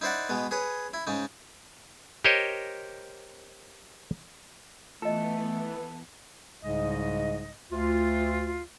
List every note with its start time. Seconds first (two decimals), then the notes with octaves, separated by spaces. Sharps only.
0.01 D#4 E4 C5 D5 F#5
0.29 B2 G#3 B3
0.51 G#4 B4 C#5
0.94 E4
1.07 G#2 C#3 D#4
2.24 G4 A#4 C5 C#5 D#5
5.02 E3 A3 B3 F4 A4 D#5
6.63 C2 G#2 C#3 G#3 D#5
7.72 D2 F4